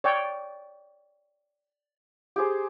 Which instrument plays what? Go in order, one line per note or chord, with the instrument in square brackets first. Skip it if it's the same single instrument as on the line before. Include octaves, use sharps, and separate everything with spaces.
[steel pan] C#5 D5 G5
[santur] G4 G#4 C5